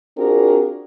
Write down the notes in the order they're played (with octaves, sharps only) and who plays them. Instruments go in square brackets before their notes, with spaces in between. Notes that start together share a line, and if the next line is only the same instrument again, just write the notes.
[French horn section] C4 D4 F4 F#4 G#4 A#4